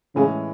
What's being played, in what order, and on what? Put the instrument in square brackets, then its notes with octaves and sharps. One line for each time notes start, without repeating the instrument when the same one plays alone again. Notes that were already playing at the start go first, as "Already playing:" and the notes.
[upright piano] A2 E3 G#3 C#4 [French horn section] C#3